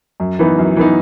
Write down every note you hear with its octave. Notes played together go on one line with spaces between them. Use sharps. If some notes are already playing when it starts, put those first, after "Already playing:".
F#2
E3 B3 D#4
F#2
E3 B3 D#4